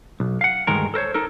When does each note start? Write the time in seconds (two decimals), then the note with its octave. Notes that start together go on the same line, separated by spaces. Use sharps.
0.20 B1
0.41 F5 F#5
0.67 D2 G2 D#3 G#3 A#4
0.94 A4 A#4 C5 C#5
1.14 D#4 A4 A#4